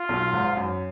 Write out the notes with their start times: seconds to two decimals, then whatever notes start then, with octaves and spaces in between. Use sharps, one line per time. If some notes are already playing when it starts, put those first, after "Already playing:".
Already playing: F4
0.09 B1 B2
0.33 G#1 G#2
0.57 F#2